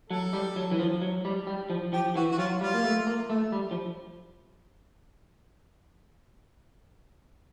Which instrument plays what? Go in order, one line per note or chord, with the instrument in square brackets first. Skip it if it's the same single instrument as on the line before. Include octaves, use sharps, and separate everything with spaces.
[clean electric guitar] F#3 [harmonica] A4
[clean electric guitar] G3
F#3
E3
F3
F#3
G3
G3
F3
[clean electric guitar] F3 [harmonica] G4
[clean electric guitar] E3 [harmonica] F#4
[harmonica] F#4
[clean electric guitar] F#3 [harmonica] F4
[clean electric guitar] G3 [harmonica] F4
[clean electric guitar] A#3
A3
A#3
A3
G3
F3